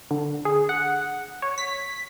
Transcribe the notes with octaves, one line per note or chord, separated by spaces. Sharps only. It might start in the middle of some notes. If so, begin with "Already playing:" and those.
D3
G#4
F#5
C#5
B6